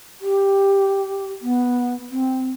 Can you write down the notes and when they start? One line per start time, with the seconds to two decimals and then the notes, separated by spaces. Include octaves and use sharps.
0.21 G4
1.41 B3
2.11 C4